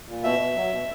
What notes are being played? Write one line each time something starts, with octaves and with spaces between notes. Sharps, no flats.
A#2
B2 E5
B2
F#3
B2